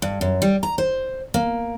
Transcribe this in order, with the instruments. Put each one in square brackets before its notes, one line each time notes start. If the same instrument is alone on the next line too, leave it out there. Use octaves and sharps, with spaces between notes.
[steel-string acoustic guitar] G2
F#2
G3
A#5
C5
A#3